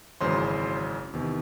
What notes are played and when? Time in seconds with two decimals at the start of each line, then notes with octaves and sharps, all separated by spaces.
0.21 G#1 F#2 C#3 E3 C5 C6
1.13 E2 C3 D#3